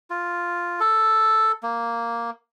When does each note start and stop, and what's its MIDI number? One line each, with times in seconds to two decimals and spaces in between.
0.10 0.80 65
0.80 1.52 69
1.63 2.30 58